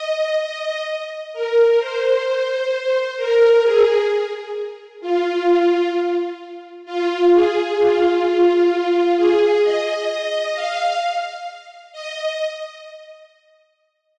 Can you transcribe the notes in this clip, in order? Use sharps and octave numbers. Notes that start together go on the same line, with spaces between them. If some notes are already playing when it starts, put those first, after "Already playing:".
Already playing: D#5
D#5
A#4
C5
A#4
G#4
F4
F4
G#4
F4
F4
G#4
D#5
D#5
F5
D#5